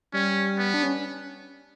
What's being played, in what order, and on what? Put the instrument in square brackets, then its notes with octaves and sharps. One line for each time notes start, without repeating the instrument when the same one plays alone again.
[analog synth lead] G3 [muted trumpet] C#4
[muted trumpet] B3
[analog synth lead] D4
C#4